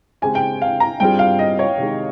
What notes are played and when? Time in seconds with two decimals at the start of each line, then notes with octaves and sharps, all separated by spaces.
0.22 C#3 G#3 C4 G4 G#5
0.35 G5
0.62 F5
0.80 A#5
1.00 G2 G3 C4 F4 G#4 G5
1.19 F5
1.39 D#5
1.59 C#5
1.78 C3 D#3 G#3